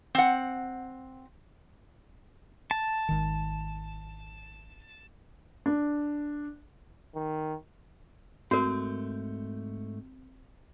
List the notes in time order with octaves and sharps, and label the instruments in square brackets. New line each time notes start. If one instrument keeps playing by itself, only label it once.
[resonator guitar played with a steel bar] C4 F#5
[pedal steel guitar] A5
[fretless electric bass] G#1 D#3
[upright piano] D4
[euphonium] D#3
[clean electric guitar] G#2 A3 [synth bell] C4 [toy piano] F#4 A#4